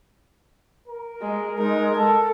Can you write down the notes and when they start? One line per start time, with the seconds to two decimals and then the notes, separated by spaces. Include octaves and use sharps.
0.88 A#4
1.22 G#3
1.58 G#3 D#4 A#4
1.96 A4 A5